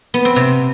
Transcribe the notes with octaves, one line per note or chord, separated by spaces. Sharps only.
B3
C4
C3